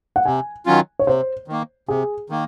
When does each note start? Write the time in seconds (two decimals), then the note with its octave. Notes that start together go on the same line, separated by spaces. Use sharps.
0.16 F#5
0.25 C3 G#5
0.66 D#3 F#3 C#4 F4
0.99 C#5
1.07 C3 C5
1.48 D#3 A#3
1.88 C3 G#4
2.30 D#3 A#3